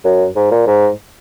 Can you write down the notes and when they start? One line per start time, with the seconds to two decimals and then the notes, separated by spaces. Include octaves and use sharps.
0.04 F#2
0.36 G#2
0.51 A#2
0.67 G#2